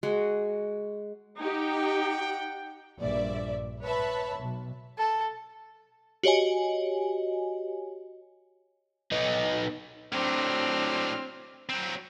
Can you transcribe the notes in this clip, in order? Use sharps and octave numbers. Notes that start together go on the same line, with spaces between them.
G#3 F#4
D#4 G4 F#5 G5
A#1 G2 D5 E5
B4 C#5 E5 A5 B5
B1
A4
F#4 G4 C#5 D#5 G#5
B3 D#4
A2 F#3 C4 D4 F6
F#3 C4